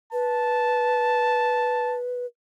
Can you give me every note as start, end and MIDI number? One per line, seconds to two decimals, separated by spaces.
0.13 2.26 71
0.13 1.97 81